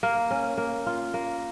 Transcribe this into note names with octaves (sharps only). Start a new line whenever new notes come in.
A#3
C#4
A#3
F4
A#3